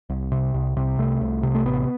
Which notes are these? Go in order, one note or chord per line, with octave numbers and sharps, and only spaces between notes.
C2
C3
C2
C3
C2 A3
C2
C3
A3
A1 B3